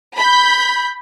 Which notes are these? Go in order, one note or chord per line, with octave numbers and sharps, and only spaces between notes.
B5 G6